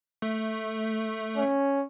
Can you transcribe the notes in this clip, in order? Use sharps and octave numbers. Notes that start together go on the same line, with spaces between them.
A3
C#4